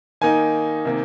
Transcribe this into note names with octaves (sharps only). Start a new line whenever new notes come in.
D#3 A#3 D#4 G#5
C3 D#3 A#3